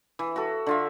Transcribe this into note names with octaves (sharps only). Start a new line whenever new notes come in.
E3
F#4 A4
D3 F4 E5